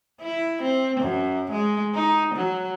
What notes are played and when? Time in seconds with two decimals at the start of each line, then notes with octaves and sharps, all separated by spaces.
0.21 E4
0.62 C4
1.00 F#2
1.51 G#3
1.94 D#4
2.34 F#3